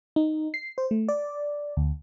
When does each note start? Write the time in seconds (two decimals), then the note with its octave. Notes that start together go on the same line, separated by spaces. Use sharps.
0.16 D#4
0.54 C7
0.78 C5
0.91 A3
1.09 D5
1.77 D2